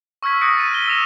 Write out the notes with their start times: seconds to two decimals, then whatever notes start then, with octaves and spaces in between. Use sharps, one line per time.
0.23 C#6 E6 F6 G#6 B6
0.41 D#6 F#6 A#6 C#7 D7
0.56 A6 D#7
0.71 F6 A#6 B6 G7
0.88 E6 A#6 E7 F7